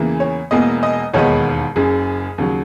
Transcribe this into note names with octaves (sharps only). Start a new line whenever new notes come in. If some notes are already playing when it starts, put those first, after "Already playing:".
Already playing: E2 C#3 E3 A#3
C#5
E1 E2 B2 A#3 D#5
D#5
E1 D#2 D#3 G#3 B3 C#5
F#1 F#2 C#3 G#4
D#2 C#3 F#3